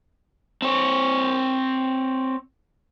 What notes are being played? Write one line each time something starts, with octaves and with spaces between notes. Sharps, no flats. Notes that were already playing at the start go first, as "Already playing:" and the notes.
C4 C#5